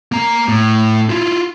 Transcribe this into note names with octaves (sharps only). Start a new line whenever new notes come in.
A#3 A#5
A2
E4 F4